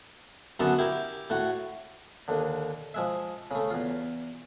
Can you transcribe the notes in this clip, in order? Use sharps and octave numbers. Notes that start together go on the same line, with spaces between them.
F#2 D3 B3 F#4 A4
E4 G4 A#4
A2 F#4
D#2 D3
F3 G#3 E5
C#3 A3
E2 F4